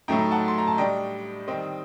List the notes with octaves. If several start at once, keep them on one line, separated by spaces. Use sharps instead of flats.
A2 F#3 A3 D#4 G5 A#5
F#5 A5
C6
A#5
A5
A2 G3 D4 D#5 G5
D#3 G3 C4 D#5 G5